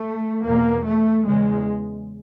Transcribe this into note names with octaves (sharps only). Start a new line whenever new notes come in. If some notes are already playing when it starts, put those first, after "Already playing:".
Already playing: A3
E2 B2 A#3
A3
E2 C#3 G#3